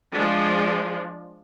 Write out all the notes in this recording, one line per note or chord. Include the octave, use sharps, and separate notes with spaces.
F3 G#3 D4